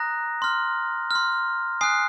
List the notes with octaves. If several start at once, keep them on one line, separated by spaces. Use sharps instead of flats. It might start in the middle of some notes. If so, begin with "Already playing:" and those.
Already playing: A#5 D#6 F#6 A#6
C6 F6
C6 F6
G#5 D#6 F#6 C7